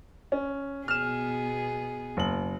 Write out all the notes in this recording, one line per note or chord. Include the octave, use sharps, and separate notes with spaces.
C#4
B2 B3 G#4 F6 E7
F#1 F#7